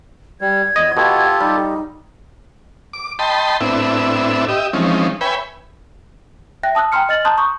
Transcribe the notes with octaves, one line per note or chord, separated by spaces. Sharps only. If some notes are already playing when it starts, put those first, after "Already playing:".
G3 G#6
E2 D#5
B2 F4 G4 A4
G3 D#4
D6
D#5 G5 A5 B5 C6
A2 B3 C4 D4 E4 E5
G4 D#5 E5
E3 F3 G#3 C4 C#4 D#4
B4 C#5 E5 G5 G#5 B5
E5 G5 F#6 A#6
A5 D#6 E6 F#6
G5 G#5 A#5 C6 F6 C#7
D#5 F6 A6 F#7
A5 A#5 C6 D#6 F#6 G6
A#5 C#6 D#6 G6